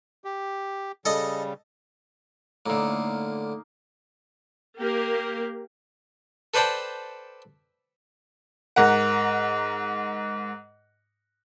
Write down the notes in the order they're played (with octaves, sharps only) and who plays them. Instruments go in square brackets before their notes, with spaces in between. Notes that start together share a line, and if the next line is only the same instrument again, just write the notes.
[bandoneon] G4
[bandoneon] C#3 G3 [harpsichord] A4 D#5
[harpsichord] A2 D3 [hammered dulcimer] A#3 D#4 F5
[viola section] A#3 G4 A#4
[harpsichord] A4 B4 C5 D5 G5 A5
[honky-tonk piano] G#2 A#4 F#5